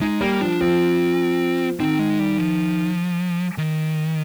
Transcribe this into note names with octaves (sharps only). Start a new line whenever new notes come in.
G#3 D#4
G3 A#3
F3 D4
F3 C4
D#3 C4
G#3
G3
F3
D#3